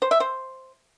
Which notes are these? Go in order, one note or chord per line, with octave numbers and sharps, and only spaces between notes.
C5
E5
C5